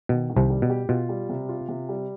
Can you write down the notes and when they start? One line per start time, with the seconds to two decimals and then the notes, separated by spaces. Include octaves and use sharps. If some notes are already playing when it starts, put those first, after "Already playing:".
0.09 B2 D#3
0.30 D#3
0.36 C2 C3
0.50 G3
0.62 B2
0.70 G4
0.89 B2 F4
1.09 G3
1.29 C3
1.49 F4
1.69 C3
1.89 G3